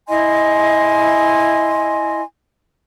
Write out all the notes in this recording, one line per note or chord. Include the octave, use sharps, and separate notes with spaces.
E4 D#5 G#5 C6